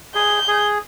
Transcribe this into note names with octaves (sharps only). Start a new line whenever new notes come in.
G#4 G6
G#4